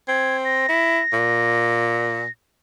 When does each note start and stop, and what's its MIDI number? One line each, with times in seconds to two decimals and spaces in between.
0.08 0.68 60
0.08 0.37 92
0.45 2.31 94
0.69 1.00 64
1.13 2.24 46